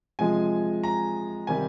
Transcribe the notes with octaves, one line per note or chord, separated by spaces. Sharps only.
C3 F3 G#3 G#5
A#5
C3 D#3 G3 G#5